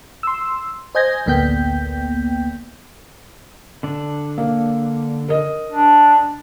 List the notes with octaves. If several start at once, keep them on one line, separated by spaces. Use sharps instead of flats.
C6 E6
C5 D#5 G#5 G6 G#6 A#6
A1 D2 A#3 B3 G5 G6
D3 D4
A#3
A#4 D#5
D4